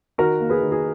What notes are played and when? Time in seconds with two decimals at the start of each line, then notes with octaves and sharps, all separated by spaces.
0.18 D#3 F#4 A#4
0.40 A#3
0.50 G#4 B4
0.61 D#3
0.72 G#4